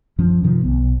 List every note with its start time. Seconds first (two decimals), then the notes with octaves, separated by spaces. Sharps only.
0.18 F#2 F3 C#4
0.43 G2 C3 D#3 F3
0.63 B1 B3